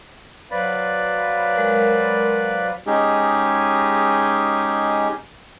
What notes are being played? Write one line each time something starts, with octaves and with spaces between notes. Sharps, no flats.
F#3 B4 C5 D5 F5 B5
G#3 A#4
G#3 C#4 D#4 G4 G#4